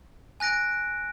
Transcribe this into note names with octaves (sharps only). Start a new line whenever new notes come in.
G#5 F#6 A#6 D7